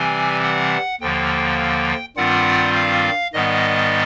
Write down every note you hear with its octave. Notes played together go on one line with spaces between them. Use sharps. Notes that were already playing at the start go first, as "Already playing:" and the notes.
Already playing: C3 E3 G3 C4 G#5
F#5
D#2 D3 F3 A#3 G5
G2 D#3 G3 C4 F4 F#5
F5
G#2 D#3 G3 B3 D#5